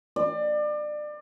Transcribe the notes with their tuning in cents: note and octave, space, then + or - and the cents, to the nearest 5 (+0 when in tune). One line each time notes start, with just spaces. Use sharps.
D5 +30